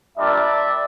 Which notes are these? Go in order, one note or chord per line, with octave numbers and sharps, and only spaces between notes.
G3 A#3 D4 F4 D5 E5